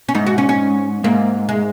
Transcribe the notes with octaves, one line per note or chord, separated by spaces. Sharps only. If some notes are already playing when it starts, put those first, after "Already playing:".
C#4
G#2 D#4
F#4
C#4
C#4
G#2 A#3
G#3